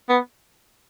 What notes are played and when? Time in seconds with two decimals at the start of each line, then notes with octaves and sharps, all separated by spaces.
0.09 B3